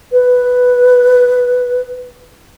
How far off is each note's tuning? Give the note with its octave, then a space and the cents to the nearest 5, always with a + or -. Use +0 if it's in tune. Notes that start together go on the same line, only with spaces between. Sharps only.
B4 +0